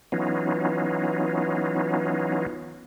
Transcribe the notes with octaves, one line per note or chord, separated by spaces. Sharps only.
E3 F#3 B3 C#4 D#4 F4